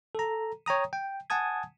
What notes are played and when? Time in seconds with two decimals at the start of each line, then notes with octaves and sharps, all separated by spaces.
0.15 A4 A#5
0.66 C#5 G5 A#5 D#6
0.93 G5
1.30 F#5 G#5 A5 D#6 G#6